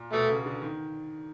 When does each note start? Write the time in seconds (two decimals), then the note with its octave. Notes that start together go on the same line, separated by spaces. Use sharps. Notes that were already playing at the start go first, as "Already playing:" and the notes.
Already playing: A#2
0.13 B2 A3
0.29 C#3
0.46 D3
0.62 D#3